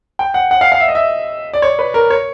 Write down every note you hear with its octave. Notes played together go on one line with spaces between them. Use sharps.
G5
F#5
F#5
F5
F5
E5
D#5
E5
D5
C#5
B4
A#4
C#5